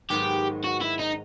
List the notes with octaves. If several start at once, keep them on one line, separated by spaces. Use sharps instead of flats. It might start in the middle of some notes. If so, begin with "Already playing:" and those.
G#2 D#3 F#3 B3 G4
F#4
E4
D#4